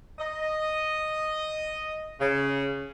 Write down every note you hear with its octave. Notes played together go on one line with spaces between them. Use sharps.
D#5
C#3